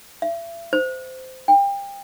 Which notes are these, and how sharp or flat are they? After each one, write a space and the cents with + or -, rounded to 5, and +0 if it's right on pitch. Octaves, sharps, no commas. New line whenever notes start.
E5 +35
C5 -20
G5 +30